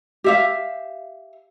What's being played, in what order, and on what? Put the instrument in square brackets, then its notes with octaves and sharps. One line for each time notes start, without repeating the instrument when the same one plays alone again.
[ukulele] G4 E5 F5